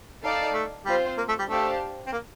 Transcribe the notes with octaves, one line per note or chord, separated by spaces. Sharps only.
D#4 A4 D5 F5 A5
A3
G3 C4 F4 C5
A#3
A3
G3
A3 D4 G4 C5 F5 A5
C4
A#3